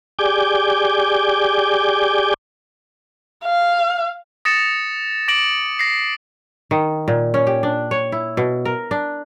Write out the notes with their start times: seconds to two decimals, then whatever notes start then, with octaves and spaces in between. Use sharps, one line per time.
0.19 G4 G#4 D5 G#5 D6 G6
3.44 F5
4.45 D#6 A6 A#6 C#7 E7
5.28 D6 A#6 D7 F#7
5.79 A#6 C7
6.71 D#3
7.08 A#2
7.34 C#4
7.47 G4
7.63 D4
7.91 C#5
8.12 E4
8.37 B2
8.65 A#4
8.91 D4